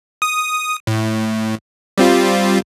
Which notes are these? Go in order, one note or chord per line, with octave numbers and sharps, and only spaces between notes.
D#6
A2
G3 C4 F4